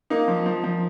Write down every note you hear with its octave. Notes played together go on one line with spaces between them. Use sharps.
A#3 D#4
F3
F3
F3